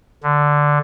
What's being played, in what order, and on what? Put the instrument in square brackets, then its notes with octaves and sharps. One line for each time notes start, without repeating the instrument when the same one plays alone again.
[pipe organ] D3